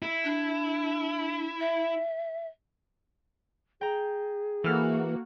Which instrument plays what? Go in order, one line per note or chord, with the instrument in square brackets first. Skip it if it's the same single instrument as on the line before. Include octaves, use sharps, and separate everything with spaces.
[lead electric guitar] E4
[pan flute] D4
E5
[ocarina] G#4 [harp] G5 A#5
[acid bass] E3 [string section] A#3 F#4 [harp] A4 F6